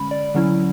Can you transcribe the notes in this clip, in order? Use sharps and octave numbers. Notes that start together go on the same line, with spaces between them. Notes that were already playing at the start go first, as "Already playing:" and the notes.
Already playing: D3 G#3 C#4 B5
D5
D3 F#3 C#4 E4